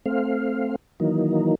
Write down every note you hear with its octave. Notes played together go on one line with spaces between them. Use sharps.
A3 C4 F5
D#3 E3 F#3 A#3 D#4